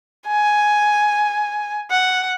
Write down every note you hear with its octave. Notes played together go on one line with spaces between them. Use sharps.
G#5
F#5